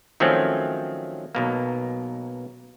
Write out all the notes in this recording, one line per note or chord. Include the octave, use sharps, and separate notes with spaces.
D#3 F3 F#3 A3 C4 C#4
B1 B2 A#3